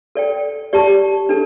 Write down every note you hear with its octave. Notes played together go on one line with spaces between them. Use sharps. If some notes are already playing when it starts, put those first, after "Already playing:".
A4 D5 G5
G4 D5 A5
D4 A4